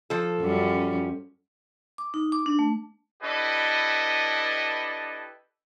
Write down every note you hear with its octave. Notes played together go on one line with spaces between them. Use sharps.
F3 A4
F#2 G3 C#4
D6
D#4
D6
D4
A3
D4 E4 G4 A4 B4 D#5